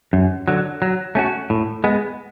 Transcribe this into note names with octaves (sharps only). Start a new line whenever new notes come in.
F#2
D3 F#3
F#3
A3 C#4 F#4
A2
G#3 B3